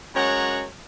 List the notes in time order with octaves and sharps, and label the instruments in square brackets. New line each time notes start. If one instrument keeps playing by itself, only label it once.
[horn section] F#2 G#3 C#5 F#5 A#5